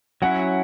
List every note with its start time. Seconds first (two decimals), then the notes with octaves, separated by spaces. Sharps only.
0.22 F#3 C#4 E4 F#5